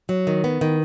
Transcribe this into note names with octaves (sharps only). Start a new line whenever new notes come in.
F#3
D#3
B3
D#3